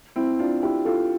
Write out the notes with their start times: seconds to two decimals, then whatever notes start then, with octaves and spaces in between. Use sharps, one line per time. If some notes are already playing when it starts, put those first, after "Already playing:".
0.16 C4 E4
0.39 D4 F4
0.62 E4 G4
0.85 F4 A4